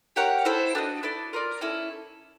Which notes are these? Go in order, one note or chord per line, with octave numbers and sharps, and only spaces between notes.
G4 A#4 C#5 F#5
E4 A4 C5
D4 F#4 B4 D#5
E4 A4 D5
F4 A#4 D5
C#4 E4 A4